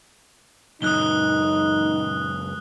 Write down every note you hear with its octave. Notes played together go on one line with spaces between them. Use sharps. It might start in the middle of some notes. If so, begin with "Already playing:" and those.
C#2 F#2 D#4 D#6 F#6 G7